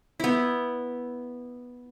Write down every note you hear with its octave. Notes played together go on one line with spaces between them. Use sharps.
B3 E4